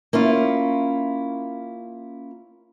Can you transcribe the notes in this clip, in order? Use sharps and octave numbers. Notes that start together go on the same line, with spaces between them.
A#3 C#4 E4 F4